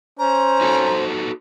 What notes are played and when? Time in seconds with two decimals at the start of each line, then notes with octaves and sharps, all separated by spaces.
0.19 C#4 C5 A#5
0.61 D#4 F#4 A4